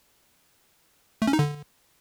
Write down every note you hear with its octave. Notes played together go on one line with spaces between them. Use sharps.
A3
C#4
D#4
D3